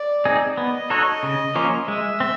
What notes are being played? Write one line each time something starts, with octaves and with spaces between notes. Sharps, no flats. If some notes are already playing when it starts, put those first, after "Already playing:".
Already playing: D5
C4 D#4 G#4
B3 D#5
D#4 F#4 A4 C#5
C#3
F3 A#3 C#4 F4
G#3 E5
C4